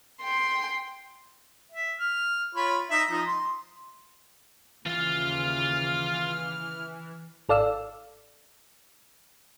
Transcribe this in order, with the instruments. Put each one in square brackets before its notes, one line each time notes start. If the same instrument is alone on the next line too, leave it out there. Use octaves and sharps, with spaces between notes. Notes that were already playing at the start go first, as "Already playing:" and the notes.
[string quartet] G5 C6
[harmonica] E5
F6
F4 C#5 B5
D#4 E5
F3 D#4
C6
[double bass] D#2 C#3 [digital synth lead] E3 [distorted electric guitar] F4 F5 [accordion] F6
[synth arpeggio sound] G#1 A4 D5 F5 E6